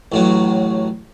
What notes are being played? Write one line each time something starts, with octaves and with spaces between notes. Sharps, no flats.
A1 A2 F#3